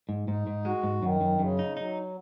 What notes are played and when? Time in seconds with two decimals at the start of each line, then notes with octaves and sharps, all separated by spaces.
0.09 G#2
0.28 G#2 D#4
0.47 G#2
0.65 G#3 F#4
0.83 G#2
1.02 F#2 D#3
1.21 F#2
1.39 F#2 C#3
1.59 D#4
1.77 F#3 D#4